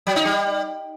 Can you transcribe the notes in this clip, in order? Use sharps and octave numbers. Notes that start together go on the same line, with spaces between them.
F#3
D#4
G3